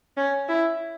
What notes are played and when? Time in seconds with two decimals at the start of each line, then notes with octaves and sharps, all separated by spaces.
0.17 C#4
0.49 E4